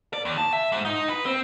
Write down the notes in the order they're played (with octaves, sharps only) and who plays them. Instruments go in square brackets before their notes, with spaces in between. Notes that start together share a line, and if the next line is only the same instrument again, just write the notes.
[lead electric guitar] D5
D#2
A5
E5
G#2
D#4
B4
C4